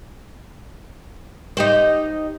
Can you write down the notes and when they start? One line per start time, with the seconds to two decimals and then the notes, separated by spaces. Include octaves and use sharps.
1.57 D#4 G4 C5